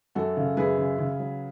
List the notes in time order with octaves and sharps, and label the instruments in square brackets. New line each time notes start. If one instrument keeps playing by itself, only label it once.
[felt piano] F#2 F#4 A4
C#3
F#2 G#4 B4
C#3
C#3
F#3